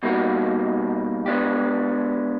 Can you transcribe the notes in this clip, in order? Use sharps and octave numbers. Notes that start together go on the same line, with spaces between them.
B2 G3 A#3 D#4 F#4
G#3 B3 D4 G4